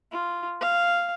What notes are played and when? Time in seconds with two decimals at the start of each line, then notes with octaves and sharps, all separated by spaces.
0.12 F4
0.61 F5